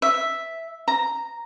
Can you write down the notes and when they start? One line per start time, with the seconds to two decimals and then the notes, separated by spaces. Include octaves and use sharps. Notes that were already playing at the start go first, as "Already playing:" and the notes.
0.02 E5
0.88 A#5